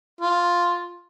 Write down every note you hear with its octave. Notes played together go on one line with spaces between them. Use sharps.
F4